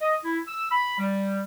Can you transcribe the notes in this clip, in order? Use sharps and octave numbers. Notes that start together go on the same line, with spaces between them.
D#5
E4
E6
B5
G3